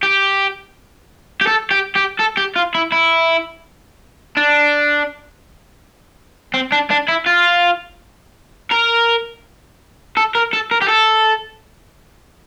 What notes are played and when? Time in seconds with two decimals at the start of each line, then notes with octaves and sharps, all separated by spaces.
0.03 G4
1.41 G4
1.47 A4
1.71 G4
1.96 G4
2.20 A4
2.38 G4
2.56 F4
2.75 E4
2.92 E4
4.37 D4
6.54 C4
6.72 D4
6.90 D4
7.08 E4
7.26 F4
8.71 A#4
10.17 A4
10.35 A#4
10.53 A4
10.71 A#4
10.82 G4
10.89 A4